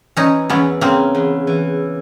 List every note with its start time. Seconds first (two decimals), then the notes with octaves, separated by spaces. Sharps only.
0.17 E3 C#4 D#4
0.50 E2 B3 C#4
0.81 C#3 A#3 C4
1.15 E2
1.47 E3